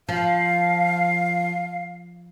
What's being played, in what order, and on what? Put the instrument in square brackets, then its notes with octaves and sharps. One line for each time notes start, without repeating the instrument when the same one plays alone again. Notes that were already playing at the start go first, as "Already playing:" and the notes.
[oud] F3 [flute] F5